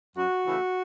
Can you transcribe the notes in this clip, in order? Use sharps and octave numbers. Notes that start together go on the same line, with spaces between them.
F#2 F#4
C#3 E3 A3